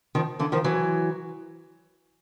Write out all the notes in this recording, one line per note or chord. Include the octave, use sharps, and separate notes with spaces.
D#3 F3
D3 E3
D#3 F3
E3 F#3